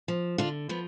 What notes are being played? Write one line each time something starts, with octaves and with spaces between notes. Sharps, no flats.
F3
D3 D4 F4
F3 B3